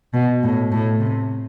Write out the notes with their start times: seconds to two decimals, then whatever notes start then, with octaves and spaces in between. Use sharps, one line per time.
0.14 B2
0.43 A2
0.72 A2
1.00 C3